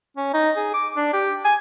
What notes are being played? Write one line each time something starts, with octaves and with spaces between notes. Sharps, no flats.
C#4
D#4
G#4
D6
D4
G4
G#5